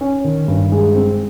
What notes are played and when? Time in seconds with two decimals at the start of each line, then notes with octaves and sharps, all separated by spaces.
0.01 C#4
0.24 D#3
0.48 G2
0.72 G#3
0.95 C4